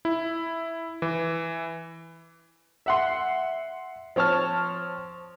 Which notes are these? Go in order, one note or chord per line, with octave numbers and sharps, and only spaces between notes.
E4
E3
E5 F#5 C6
F3 C4 C#5 A5 F6